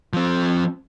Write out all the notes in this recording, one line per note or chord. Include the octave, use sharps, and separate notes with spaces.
F3 C4